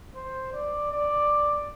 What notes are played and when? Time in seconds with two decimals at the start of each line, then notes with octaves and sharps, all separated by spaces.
0.15 C5
0.53 D5
0.92 D5